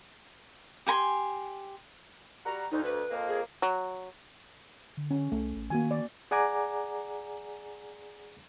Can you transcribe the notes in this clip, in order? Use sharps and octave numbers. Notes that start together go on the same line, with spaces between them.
G4 G#5 A#5 C6
G3 F#4 A#5
D2 D#4
B4
F2 A#3
G#4
F#3
D3
C#4
C2 A3
A1
D#3 A#3 F#4 G#5
D5
G#4 D5 F#5 G#5 A#5 D6